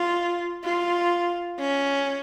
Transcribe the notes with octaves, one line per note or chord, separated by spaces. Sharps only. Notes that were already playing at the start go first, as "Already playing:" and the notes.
Already playing: F4
F4
C#4